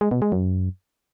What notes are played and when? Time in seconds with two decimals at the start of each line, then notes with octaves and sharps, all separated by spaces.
0.01 G#3
0.11 B2
0.22 G#3
0.32 F#2